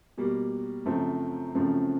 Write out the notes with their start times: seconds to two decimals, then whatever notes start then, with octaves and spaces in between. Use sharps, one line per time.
0.18 B2 G3 A#3
0.85 F#2 C#3 F3 A3 C4
1.55 F#2 C#3 F3 A3 C4